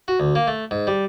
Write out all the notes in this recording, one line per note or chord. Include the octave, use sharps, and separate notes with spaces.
F#4
D2
A#3
A3
G#2
G3